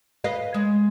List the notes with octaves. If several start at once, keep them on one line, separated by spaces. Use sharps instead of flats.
B4 D#5 F5
G#3